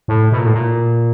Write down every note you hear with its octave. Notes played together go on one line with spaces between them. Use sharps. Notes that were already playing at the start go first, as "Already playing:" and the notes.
A2
B2
A#2
A2
A#2